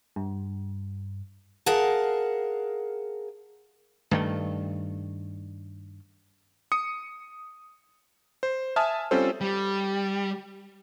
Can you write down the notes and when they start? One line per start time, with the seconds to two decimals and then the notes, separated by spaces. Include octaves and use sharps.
0.16 G2
1.66 G#4 A#4 F5 F#5 A5
4.11 G2 D#3 A3
6.72 D#6 C#7
8.43 C5
8.76 E5 G#5 A5 D#6 F6
9.11 G3 C4 C#4 F4 A4 C5
9.41 G3